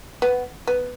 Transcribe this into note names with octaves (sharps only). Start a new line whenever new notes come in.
B3
B3